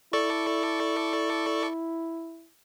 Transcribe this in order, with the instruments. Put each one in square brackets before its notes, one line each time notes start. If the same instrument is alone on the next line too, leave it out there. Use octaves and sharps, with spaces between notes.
[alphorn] E4 [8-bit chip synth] A4 D5 C#6